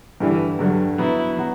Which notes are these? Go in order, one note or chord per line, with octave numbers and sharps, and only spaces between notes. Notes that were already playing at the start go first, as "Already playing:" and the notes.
G2 D3 E3 G3
G2 D3 F#3 G3
F#3 B3 E4 F#4
F#3 B3 F#4